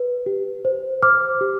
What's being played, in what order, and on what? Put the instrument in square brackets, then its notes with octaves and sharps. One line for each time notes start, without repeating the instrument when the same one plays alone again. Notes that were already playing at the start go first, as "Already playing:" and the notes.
Already playing: [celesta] B4
G4
C5
C5 D6 F6
G4